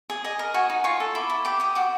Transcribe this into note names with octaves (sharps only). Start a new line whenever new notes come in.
G#4
D#5 G#5
A#4
F#4 G#5
D#4
F4 C#6
A4
E4 D6
E4
G4 D6
G4 D#6
F#4 D6